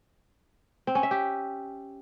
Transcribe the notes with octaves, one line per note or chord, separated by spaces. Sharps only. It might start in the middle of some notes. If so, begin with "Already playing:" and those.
C4
C#4
E5
G4